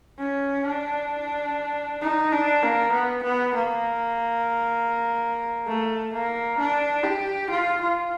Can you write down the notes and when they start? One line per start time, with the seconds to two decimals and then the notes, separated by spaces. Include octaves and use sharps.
0.19 C#4
0.65 D4
2.01 D#4
2.32 D4
2.63 A#3
2.93 B3
3.23 B3
3.54 A#3
5.67 A3
6.13 A#3
6.59 D4
7.04 G4
7.50 F4
7.81 F4